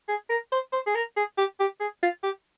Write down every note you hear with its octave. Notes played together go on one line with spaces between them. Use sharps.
G#4
A#4
C5
C5
G#4
A#4
G#4
G4
G4
G#4
F4
G4